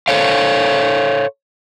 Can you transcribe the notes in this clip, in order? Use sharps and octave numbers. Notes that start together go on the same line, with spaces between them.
A4 C5 C#5 F5